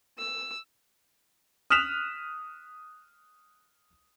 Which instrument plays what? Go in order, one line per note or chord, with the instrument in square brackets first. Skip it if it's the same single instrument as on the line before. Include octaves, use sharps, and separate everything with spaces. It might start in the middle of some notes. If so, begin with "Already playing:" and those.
[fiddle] E6
[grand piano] D#6 F6 F#6 B6 E7 F7